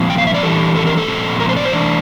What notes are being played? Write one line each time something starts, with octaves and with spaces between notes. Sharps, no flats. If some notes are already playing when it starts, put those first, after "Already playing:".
Already playing: A#2 F3 C4
G5
F5
E5
D5
E3 G3 D4 A4
A4
A#4
A4
A#2 F3 A3 C4
A#4
C5
D5
C5
E3 A3 D4 D5